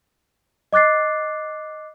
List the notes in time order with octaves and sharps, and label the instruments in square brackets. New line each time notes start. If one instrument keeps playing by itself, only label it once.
[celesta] D#5 D6 F#6 A6 C7